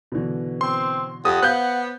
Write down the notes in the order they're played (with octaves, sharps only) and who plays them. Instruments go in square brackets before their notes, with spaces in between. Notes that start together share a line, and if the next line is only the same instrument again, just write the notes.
[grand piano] B2 D3 E3
[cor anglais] C4 [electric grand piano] C6
[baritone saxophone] F2 [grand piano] G4 [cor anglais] F#5 [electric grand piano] D#6
[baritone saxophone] B3 [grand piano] C5 F5 [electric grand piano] F#6 G6